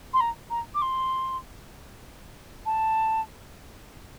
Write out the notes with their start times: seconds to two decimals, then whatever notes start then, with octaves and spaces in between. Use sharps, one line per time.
0.13 C6
0.20 A#5
0.50 A#5
0.75 D6
0.82 C6
2.66 A5